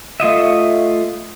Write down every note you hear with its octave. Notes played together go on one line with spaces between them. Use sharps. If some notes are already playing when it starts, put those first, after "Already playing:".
A3 F4 D#5 E5